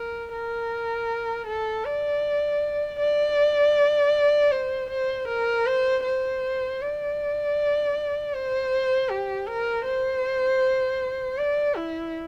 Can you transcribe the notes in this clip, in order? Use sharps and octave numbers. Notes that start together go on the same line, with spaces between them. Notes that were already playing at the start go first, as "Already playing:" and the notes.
Already playing: A#4
A#4
A4
D5
D5
C5
C5
A#4
C5
C5
D5
C5
G4
A#4
C5
D5
E4